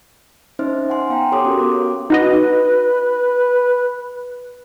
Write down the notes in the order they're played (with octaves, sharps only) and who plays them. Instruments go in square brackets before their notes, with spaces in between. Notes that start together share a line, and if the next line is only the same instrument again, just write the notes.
[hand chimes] C#4 D#4 C5 E5 C6 F6
F#5 G#5 C6
B3 F5 G5 A#5
G4 A4 C#5 C6 D6 D#6
C#4 F#4 A#4
B3 D6
[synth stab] D#4 F#4 D#5 [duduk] B4